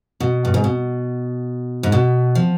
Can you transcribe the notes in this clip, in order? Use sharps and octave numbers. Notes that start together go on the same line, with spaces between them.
B2
G2
G#2
B2
G#2
B2
F3